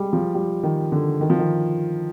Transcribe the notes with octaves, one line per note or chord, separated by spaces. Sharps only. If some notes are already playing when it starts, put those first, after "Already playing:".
Already playing: G3 G#3
F3
G3
D#3
D3
D#3
F3
D#3